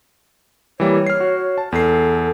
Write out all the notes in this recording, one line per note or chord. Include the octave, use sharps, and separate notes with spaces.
E3 G3 A#3 C#5
F6 C7
F#4
A5
E2 A4 C7